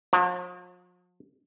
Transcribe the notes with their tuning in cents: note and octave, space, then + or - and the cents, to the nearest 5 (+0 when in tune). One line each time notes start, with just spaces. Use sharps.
F3 +45